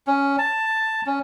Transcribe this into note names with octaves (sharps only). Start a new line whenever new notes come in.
C#4
A5
C#4